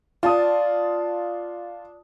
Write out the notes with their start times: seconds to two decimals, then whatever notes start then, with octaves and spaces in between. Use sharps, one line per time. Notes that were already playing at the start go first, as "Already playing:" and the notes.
0.23 D4 F4 A5 D#6